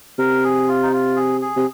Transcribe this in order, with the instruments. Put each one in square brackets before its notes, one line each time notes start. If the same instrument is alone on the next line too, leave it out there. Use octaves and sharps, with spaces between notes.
[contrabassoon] C3 [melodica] A#4
[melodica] G#4
F4
D#4
F4
G#4
G#4
[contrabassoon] C3